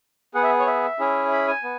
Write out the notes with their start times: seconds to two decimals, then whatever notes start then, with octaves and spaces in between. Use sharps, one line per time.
0.34 B3 G#4 F#5
0.43 E5
0.59 C#5
0.67 E5
0.99 C#4 E4 G#4
1.32 B5
1.48 G#5
1.64 B3